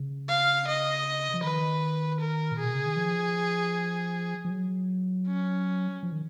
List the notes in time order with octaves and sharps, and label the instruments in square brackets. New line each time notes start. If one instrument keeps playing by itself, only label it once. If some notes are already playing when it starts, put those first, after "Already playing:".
Already playing: [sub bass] C#3
[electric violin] F5
D#5
[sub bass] F3
[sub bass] D#3 [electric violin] B4
[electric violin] A#4
[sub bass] A#2
[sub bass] B2 [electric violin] G#4
[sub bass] C#3
D#3
F3
F3
F#3
[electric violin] C#4
[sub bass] F3
D#3